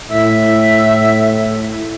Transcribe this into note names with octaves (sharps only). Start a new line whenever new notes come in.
A2 E5